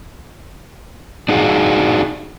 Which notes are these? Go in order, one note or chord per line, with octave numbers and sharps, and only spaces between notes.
D4 D#4 F#4 G#4 F5